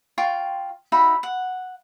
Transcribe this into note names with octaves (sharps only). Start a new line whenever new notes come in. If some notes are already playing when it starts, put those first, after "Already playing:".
F4 G5 C6 C#6
D#4 F#4 E5 B5
F#5